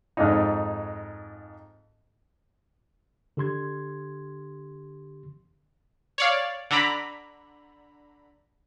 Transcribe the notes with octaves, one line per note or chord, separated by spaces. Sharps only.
F2 G#2 D#4
D3 G4 C6 G#6
C#5 D5 F5
D3 D4 A#5 B5